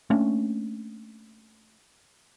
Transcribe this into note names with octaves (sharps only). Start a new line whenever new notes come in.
A3 A#3 C#4 D4